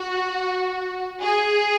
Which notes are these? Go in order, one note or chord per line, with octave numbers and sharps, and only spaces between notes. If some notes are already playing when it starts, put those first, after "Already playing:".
Already playing: F#4
G#4